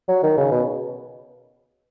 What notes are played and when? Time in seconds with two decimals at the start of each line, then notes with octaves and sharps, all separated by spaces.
0.08 F#3
0.23 D#3
0.37 C#3
0.52 B2